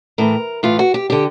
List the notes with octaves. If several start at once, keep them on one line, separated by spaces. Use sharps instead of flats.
A2 E3 A#4
A2 E3 F4
F#4
G4
D3 G4